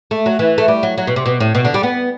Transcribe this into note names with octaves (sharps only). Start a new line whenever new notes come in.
A3
F#3
E3
A3
G3
F#3
F#3
B2
C3
B2
A2
B2
D3
G3
B3